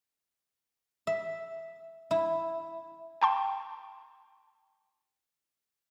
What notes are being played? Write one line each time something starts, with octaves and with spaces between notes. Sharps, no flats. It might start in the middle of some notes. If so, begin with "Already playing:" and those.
E5
E4
G5 A5 C6